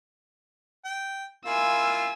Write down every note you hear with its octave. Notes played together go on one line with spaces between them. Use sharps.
G5
A#3 E4 F4 G#5 E6